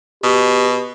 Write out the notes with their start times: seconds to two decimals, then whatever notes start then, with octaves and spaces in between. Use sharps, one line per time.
0.24 B2 G4